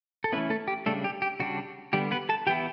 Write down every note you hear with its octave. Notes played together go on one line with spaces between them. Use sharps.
A4
E3 A3 B3 C#4 E4 B4
A3 A4
G4
C#3 G3 A3 D4 A4
G4
G4
C#3 G3 D4 F#4
D3 G3 B3 G4
B3 B4
A4 A5
E3 B3 E4 G4 G5